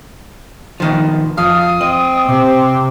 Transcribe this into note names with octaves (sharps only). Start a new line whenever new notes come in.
B2 D#3 F3
F2 F5 D#6
C4 D#5
C3 D6